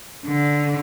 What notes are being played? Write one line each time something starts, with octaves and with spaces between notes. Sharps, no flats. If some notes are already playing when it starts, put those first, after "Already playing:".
D3